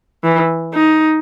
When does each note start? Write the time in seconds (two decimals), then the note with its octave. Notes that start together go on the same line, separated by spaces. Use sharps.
0.24 E3
0.74 D#4